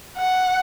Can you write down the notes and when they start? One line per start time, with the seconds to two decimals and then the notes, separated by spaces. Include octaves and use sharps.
0.18 F#5